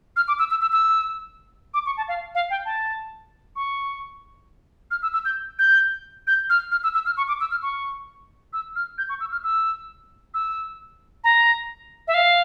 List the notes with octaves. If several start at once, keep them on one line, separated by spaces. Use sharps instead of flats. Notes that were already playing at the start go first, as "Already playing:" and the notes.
F6
D6
E6
E6
E6
E6
D6
C#6
A5
F5
F5
G5
A5
C#6
F6
E6
E6
G6
G6
G6
F6
F6
E6
E6
F6
C#6
D6
E6
F6
C#6
E6
F6
G6
C#6
E6
F6
E6
E6
A#5
E5
F5